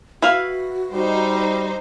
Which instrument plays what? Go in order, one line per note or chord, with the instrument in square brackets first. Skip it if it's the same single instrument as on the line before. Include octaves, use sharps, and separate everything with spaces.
[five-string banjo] E4 B4 F5 [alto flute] F#4
[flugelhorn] G3 [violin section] D#4 C5